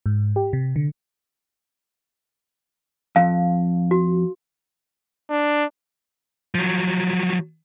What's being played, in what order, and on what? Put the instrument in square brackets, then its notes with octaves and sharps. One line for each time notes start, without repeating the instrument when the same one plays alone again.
[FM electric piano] G#2
G4
C3
D3
[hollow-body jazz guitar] F2 [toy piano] F5
[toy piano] F#4
[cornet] D4
[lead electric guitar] F3 F#3